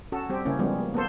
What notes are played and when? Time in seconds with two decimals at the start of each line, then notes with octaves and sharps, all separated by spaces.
0.12 C#4 F#4 A4
0.29 G3 C4 G4
0.45 C#3 A#3 C#4 E4
0.59 F3 G3 G#3 B3 C#4
0.80 A#3
0.94 A#3 B3 A4 C5